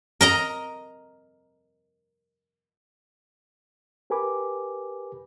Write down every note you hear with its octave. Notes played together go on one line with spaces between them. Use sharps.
A#4 D#5 A#5
G4 A#4 B4 G#5 B5 D6